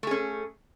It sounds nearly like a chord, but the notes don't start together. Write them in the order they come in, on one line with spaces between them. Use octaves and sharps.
A3 G#4 C#4